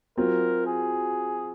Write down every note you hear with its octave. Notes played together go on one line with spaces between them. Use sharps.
F#3 C4 F4 A#4
G#4